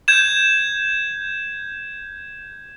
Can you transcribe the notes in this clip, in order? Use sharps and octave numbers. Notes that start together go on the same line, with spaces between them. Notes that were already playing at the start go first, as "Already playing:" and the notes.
G6 G#6 E7